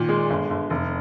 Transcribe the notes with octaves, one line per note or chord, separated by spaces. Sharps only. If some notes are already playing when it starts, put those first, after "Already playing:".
Already playing: A#2 D#3
G#3
G1
G1
F1